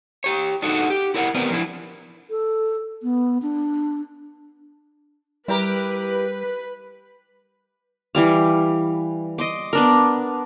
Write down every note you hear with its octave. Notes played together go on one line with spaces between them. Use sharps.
G4 C#5
D4 D#4 F#4 A4 F5 F#5
G4
E4 A#4 C#5 F#5
D#3 B3 C4 A#4 B4 D5
F3 D4 E4
A4
B3
D4
G3 E4 G4 A#4 B4
E3 G3 F5
D#5 C6 D6
B3 D4 A#4